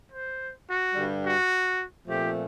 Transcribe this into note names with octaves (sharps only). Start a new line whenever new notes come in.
C5
F#4
G2 D3 G3
F#4
A#2 F3 A3 C4 G4